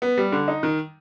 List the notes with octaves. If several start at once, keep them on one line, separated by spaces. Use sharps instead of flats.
B3
G3
D3
D#4
D#3